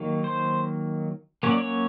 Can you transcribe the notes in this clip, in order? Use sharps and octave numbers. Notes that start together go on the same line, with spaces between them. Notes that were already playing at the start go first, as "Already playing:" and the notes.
Already playing: D#3 F#3 A#3
C5
F#3 A#3 C#4 C#5
D5
C#5